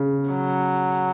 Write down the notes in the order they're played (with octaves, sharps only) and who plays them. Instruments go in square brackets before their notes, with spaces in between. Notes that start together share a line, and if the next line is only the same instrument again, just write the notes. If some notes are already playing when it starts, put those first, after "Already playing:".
Already playing: [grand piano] C#3
[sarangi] F#3